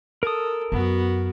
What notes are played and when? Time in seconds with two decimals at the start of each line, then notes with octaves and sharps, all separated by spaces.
0.23 A4 A#4 D#6
0.72 F#2 B3 F#4